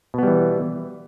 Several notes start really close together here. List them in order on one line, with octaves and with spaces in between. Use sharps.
B2 B3 G3 E3